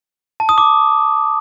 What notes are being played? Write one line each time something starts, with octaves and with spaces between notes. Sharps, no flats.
A5
D#6
D6